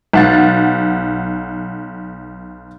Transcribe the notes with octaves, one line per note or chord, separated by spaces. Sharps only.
B1 F#5 A6